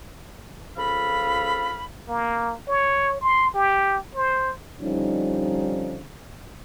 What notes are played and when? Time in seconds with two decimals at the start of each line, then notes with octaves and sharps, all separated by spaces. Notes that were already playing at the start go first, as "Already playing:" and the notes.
0.77 C#2 F3 A4 F5 B5
2.09 A#3
2.68 C#5
3.21 C6
3.54 G4
4.15 C5
4.82 D3 F3 G3 C#4 D#4